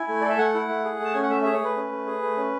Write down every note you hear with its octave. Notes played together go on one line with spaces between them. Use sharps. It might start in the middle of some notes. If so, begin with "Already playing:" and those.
Already playing: E4 G#5
A3
A4 D5
E5
A3 F#5
E4
A3
G#4
A3 A5
C#4 G#5
F#5
A3 E5
G#4 E5
C#5
A3 B4
C#4
A3
G#4
A3
C#4